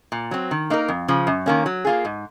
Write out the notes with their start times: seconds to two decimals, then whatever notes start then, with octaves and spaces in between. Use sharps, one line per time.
0.12 A#2
0.31 F#3 C4
0.51 D#3
0.70 A#3 D#4 A#4
0.88 F2
1.08 C#3 F3
1.27 F#2
1.46 D#3 A#3 C#4
1.66 F#3
1.85 A#3 F4 G#4
2.05 G#2